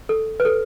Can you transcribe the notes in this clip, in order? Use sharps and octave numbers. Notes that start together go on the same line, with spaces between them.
A4
B4
A4